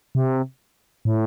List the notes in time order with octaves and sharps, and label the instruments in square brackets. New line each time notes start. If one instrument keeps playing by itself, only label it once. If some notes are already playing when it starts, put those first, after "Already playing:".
[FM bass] C3
A2